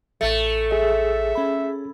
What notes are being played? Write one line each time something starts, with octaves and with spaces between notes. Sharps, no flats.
A1 A3 A6 C#7
G#4 E5
C#4 B5